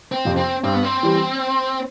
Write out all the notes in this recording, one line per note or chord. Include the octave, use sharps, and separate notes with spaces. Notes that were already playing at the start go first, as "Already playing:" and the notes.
C4
F2 C3 F3
C4
G2 C4
B3
C4
E3 G3